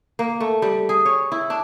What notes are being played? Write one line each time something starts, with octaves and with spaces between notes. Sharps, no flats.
A#3
A3
G3
G#4
C#5
E4
D4